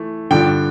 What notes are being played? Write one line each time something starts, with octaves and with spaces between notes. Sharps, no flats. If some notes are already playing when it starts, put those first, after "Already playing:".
Already playing: E3 A3
G2 D3 F3 G5